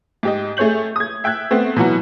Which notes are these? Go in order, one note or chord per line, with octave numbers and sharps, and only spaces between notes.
G#2 G4 D#5
A3 G#4 C#5 G6 F#7
D#6 G#6
E5 G5 F#6 G#6
A3 B3 C4
B2 E3 F#3 F#4